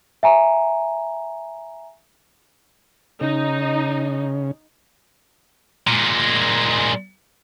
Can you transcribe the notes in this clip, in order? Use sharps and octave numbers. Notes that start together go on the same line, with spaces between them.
E5 G#5 A#5
C#3 D#4
A#2 G#3